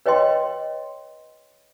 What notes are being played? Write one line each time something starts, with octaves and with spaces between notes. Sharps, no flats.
B4 C#5 D#5 G5 C6